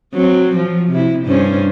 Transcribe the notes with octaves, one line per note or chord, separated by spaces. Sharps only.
F#3 C4
F3
C3 E4
G2 C#4 C5